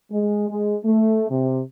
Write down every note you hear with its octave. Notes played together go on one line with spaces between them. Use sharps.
G#3
G#3
A3
C3